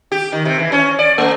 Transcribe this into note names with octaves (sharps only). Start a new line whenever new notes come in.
G4
D#3
C3
E3
C#4
D5
A3